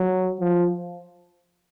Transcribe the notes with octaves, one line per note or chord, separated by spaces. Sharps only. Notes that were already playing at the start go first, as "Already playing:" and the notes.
Already playing: F#3
F3